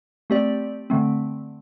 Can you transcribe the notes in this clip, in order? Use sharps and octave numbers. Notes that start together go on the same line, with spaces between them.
A3 C4 G4 D5
D3 A3 C4